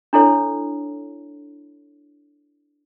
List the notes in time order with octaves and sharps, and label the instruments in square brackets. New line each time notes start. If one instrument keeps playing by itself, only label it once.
[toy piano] D4 E4 A4 C#5